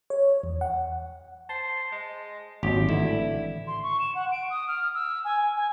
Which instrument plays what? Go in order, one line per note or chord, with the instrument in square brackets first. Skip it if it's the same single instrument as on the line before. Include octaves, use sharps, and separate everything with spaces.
[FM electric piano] C#5
E2
F#5
[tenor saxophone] C5 [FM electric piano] A5
[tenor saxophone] G#3
[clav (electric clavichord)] G#1 [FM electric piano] A#2 F#3 [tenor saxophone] G4
[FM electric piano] A2 E3 [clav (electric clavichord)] D3 [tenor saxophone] E4
[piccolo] C6
C#6
E7
F#5
D7
D#6
F6
E6
G#5
G#5